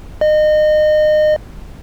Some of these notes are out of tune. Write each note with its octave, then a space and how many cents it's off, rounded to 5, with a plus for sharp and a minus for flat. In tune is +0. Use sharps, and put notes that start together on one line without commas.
D#5 -30